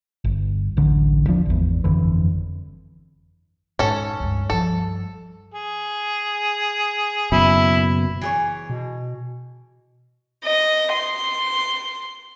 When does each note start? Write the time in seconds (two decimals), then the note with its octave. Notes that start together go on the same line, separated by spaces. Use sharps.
0.24 G1
0.77 D1 A1 D3
1.27 E2 F3 D4
1.46 G#1 E2
1.84 G1 F2 D3 E3
3.79 G#2 C#4 D#4 A4
4.20 C#2 G2
4.50 G2 F3 A4
5.54 G#4
7.32 F#1 F#2 B2 E4
8.21 E3 G#4 C#5
8.70 B2
10.45 D#5
10.92 C6